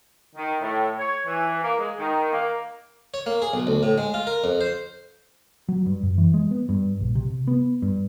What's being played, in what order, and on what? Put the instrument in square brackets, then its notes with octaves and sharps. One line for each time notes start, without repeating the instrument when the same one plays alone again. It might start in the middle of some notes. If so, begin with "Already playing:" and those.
[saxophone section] D#3
A2
C#5
E3
A#3
G#3
D#3
A#3
[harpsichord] C#5
A#3
G#4
B1
D2
A2
G#3
F4
A#4
F2
C5
[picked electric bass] F#3
G2
F#2
E3
G#3
B3
G2
A#1
C3
B3
G2